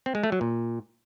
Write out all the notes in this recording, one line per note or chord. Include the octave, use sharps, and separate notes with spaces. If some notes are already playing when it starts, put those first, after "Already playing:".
C4
G#3
A3
F#3
A#2